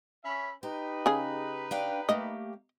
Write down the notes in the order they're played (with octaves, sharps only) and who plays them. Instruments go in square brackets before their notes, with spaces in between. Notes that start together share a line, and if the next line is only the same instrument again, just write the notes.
[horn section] C#4 E5 B5
[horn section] D#4 B4 [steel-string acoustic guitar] G4
[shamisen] C#3 G#4
[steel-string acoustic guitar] D4 F5 G5
[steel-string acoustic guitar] A3 A#3 G4 [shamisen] D#5